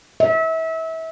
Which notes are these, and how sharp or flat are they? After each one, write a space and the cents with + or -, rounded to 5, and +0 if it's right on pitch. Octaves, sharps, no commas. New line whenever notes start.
E5 -30